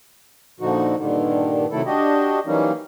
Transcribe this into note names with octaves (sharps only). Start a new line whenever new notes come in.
A#2 D3 F3 D#4 F#4
G2 A#2 D3 D#3
C3 D#3 F#3 A3 E4 A4
D4 F#4 G4 D#5
E3 F#3 G3 A#3 C#4 D#4